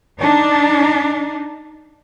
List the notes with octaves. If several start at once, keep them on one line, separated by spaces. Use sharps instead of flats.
D4 D#4